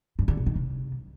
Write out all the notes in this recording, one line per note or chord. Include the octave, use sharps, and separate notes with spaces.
G2
D3
B2
D#3
C3